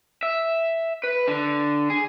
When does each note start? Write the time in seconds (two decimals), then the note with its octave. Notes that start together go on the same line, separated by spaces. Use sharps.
0.23 E5
1.03 B4
1.28 D3
1.90 G#4